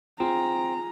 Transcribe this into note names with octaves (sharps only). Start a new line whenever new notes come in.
C4 F4 G#4 A#5